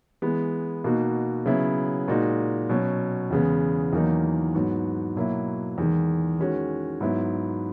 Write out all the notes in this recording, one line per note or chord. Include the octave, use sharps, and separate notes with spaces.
E3 G#3 B3
B2 A#3 D#4 F#4
C#3 F#3 B3 E4
A#2 G#3 D#4 F#4
B2 F#3 C#4
E2 C#3 G#3 B3
E2 D#3 F#3 A#3 D#4
G#2 F#3 B3 F#4
B2 F#3 A#3 E4
E2 D#3 G#3
D#3 G#3 C#4 F#4
G#2 F#3 B3 E4